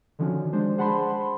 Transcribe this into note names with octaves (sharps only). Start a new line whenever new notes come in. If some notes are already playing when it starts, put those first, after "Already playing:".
D3 D#3 F3 C#4 F#4
G#3 D4 C5
G#4 C5 F#5 A5 B5 C6